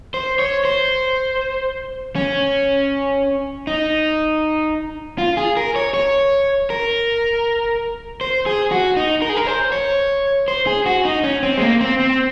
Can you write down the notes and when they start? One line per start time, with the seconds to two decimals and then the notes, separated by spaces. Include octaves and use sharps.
0.14 C5
0.39 C#5
0.65 C5
2.16 C#4
3.67 D#4
5.18 F4
5.37 G#4
5.57 A#4
5.76 C#5
5.94 C#5
6.70 A#4
8.21 C5
8.46 G#4
8.72 F#4
8.97 D#4
9.22 A#4
9.29 G#4
9.37 A#4
9.47 C5
9.72 C#5
10.48 C5
10.67 G#4
10.86 F#4
11.05 D#4
11.24 C#4
11.43 C4
11.57 G#3
11.61 A#3
11.81 C4
12.00 C4